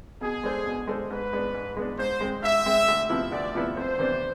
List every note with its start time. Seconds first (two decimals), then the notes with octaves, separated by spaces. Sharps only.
0.21 B2 G#4
0.43 G#3 D4 A4 C5
0.66 B2
0.87 G#3 D4 A4 C5
1.10 G#2 B4
1.33 G#3 B3 D4
1.54 G#2
1.77 G#3 B3 D4
1.98 G#2 C5
2.21 G#3 C4
2.43 G#2 E5
2.66 G#3 C4
2.88 D2
3.10 C3 F3 B3 E4
3.32 D2 D5
3.54 C3 F3 B3 E4
3.76 F2 C5
3.99 C3 E3 B3 D4